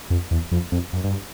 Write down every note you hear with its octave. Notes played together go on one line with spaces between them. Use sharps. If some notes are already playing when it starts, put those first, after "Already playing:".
F2
E2
F2
F2
F#2
G2